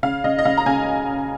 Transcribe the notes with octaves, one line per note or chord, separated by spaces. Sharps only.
C#3 F5
C#3 D#5
D#5
C#3 F5
A#5
C#3 G#5